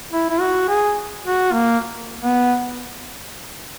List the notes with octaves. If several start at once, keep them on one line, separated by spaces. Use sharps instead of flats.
E4
E4
F#4
G#4
F#4
A#3
B3